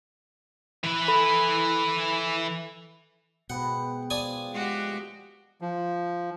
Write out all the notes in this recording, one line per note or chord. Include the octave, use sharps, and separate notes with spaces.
E3 B4
A4 B5
G#2 B2 B3 F#5 G5
F3 D5 G#5 D#6
G#3 F#4 G4
F3